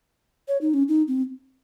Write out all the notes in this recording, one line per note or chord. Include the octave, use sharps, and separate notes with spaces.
C#5
D#4
C#4
D#4
C4